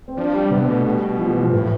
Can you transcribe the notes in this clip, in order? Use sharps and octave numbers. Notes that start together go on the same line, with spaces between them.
C4
F3 D4
G3
C3 B3
B2 A3
B2 G3
F3
E3
F3
A2 E3